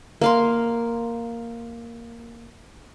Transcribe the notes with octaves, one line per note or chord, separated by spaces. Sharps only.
A#3 F5 C6